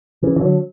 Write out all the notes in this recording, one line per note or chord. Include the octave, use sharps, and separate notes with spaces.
C#3 E3
E3
D3 F#3